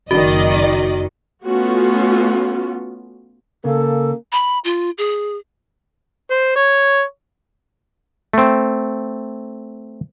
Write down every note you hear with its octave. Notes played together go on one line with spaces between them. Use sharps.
F#1 D#3 F#4 D5 D#5
A3 B3 C#4 F4 F#4
C#3 A#3 A4
B5
F4
G#4
C5
C#5
A3 C4